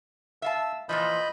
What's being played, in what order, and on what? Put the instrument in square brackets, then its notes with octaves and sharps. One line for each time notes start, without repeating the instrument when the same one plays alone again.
[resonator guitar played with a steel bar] E5 F5 A5 [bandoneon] E6
[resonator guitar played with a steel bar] A#2 E3 F3 [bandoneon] D#5 B5 G6